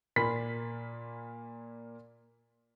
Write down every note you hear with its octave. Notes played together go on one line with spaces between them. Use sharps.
A#2 A#3 B5 B6